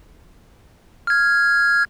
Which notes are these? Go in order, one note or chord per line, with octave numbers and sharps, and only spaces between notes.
F6 G#6